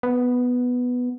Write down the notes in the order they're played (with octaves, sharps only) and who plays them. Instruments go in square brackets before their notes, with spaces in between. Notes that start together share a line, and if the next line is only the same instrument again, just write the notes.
[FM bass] B3